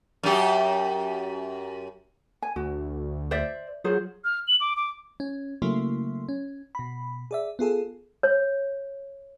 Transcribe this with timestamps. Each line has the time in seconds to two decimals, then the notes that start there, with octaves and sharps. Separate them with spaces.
0.23 F#2 G4
2.42 G#5
2.56 D2 F#4
3.31 C5 D5 E5
3.84 F#3 F4 G#4 C5
4.25 F6
4.48 F#7
4.61 D6
4.76 D6
5.20 C#4
5.62 C#3 F#3 A3 A#3 E4 C6
6.29 C#4
6.75 B2 B5
7.31 G#4 D5 E5
7.59 B3 F4 G#4 A4
8.23 C#5